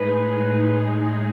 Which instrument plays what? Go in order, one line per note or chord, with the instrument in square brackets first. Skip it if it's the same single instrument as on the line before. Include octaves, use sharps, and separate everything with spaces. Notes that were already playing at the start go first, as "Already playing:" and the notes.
Already playing: [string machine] A2 G#3 D#4 G#4 [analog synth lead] B4